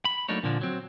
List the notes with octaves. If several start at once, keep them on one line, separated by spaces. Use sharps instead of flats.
B5
F#3 A3 A#3 D4 D#4 C#5
A#2 D3 F3 A#3 D4
F#3 C4